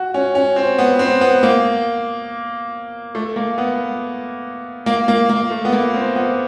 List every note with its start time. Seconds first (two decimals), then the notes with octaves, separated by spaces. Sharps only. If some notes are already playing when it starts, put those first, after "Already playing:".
Already playing: F#4
0.14 C#4
0.35 C#4
0.56 C4
0.79 B3
0.99 C4
1.21 B3
1.43 A#3
3.15 A3
3.36 A#3
3.58 B3
4.86 A#3
5.08 A#3
5.29 A#3
5.51 A3
5.65 B3
5.73 A#3
5.94 C4
6.16 B3